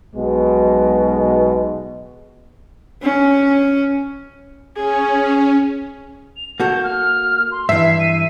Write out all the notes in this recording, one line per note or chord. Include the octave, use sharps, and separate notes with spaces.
B1 B2 G#3
C#4
C#4 G#4
F7
A#3 F#4 A4 G6
F6
C6
G2 E3 E5 C7
D#7